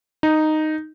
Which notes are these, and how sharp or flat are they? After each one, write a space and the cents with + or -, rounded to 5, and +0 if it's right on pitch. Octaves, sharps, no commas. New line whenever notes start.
D#4 -5